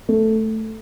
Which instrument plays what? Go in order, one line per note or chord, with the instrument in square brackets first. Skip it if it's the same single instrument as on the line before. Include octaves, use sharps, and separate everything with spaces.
[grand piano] A3